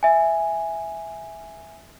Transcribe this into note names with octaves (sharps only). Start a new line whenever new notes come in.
E5 G#5